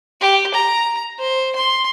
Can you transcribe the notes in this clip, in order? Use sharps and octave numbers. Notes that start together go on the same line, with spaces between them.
G4
A#5
C5
C6